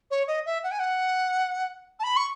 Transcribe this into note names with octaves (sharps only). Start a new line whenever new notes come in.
C#5
D#5
E5
F#5
G#5
F#5
A5
B5
C#6